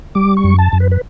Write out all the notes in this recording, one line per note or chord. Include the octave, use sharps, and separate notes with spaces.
G3 D6
C#6
F#2
A5
F#2
B4
B4